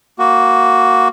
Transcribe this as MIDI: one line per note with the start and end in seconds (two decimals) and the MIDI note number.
0.19 1.08 58
0.19 1.08 66